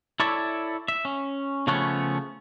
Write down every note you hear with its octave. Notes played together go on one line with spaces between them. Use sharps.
E4 A4 C#5 D5 E5
E5
C#4
C#3 F3 A3 B3 C#4 C#5